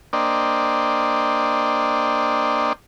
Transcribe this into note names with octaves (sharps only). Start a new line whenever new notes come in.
A#3 D4 C5 D5 D#5 G5